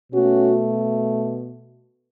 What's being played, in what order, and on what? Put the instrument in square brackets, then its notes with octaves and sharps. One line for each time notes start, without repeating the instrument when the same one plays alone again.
[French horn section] B2 A3 C#4 F#4